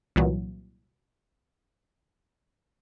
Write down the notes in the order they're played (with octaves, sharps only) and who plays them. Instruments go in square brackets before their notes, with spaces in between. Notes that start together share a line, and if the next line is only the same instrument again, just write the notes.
[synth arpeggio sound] C2 A#2 E3 F#3